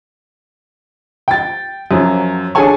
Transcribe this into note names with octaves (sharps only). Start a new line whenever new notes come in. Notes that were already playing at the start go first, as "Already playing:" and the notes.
G5 A6
F#2 F3 F#3
D4 G#4 A4 C#5 G#5 C#6